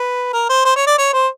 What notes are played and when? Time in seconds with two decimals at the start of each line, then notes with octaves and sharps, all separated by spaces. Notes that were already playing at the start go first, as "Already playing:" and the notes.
Already playing: B4
0.33 A#4
0.49 C5
0.65 C5
0.76 C#5
0.87 D5
0.98 C#5
1.13 C5